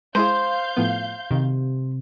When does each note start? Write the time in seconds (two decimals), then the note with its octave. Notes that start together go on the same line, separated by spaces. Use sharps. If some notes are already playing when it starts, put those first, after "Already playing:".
0.15 G#3 E4 G#4 C5 F5 G6
0.77 A2 F3 B3
1.31 C3 D#3